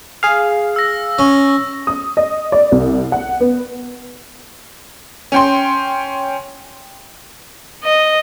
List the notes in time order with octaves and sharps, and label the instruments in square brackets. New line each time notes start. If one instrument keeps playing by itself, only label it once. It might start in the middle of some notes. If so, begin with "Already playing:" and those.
[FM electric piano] G#4 F5
[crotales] E6 A#6
[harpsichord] C#4
[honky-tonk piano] D#6
D#5
D5
C2
F#5
B3
C#4 G5 C6
[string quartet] D#5